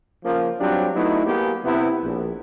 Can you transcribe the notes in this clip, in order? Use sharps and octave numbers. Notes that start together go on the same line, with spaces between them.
C#3 F3 A#3
F#3 G3 C4 D4 F4 G4
F#3 A3 B3 D#4 E4
A#3 B3 G4 G#4
C3 B3 E4
A#1